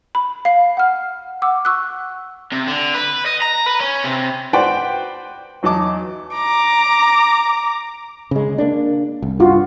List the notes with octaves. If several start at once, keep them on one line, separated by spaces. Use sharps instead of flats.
B5
F5 C7
F#5 F6
F#5 D6 E6
C#6 E6 F#6
C3
D3
B4
D#5
A#5
B4
C#4
C3
F#4 B4 C5 D5 G5
E2 F#3 D#4 A5 D6
A#5 D6
C#3 G#3
A#3 D4
C2
G2 F4 F#4